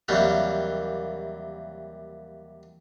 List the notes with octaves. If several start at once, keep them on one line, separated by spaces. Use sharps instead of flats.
D#2 C3 E3 F#3 G3 A#3